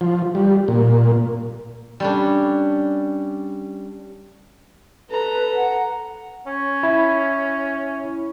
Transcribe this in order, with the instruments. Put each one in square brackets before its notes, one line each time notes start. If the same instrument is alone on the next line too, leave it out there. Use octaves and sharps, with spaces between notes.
[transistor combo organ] F3
G3
A#2
[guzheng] G3 C#4 D4
[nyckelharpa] A4 A#5 [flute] B4
[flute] F#5
[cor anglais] C#4
[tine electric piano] E4